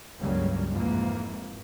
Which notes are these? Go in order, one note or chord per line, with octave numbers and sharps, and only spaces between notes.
C#2 G2 C#3 F#3 G3 A#3
F2 G#2 E3 A#3